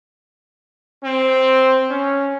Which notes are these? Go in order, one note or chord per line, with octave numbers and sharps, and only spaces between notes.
C4
C#4